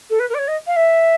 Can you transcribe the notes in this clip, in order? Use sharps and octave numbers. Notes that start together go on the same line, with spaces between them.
A4
B4
A#4
D5
C#5
D#5
F5
E5